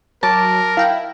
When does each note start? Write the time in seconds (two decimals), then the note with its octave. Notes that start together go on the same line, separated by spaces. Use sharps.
0.23 F#3 A#4 A5 D6
0.77 E4 F5 G5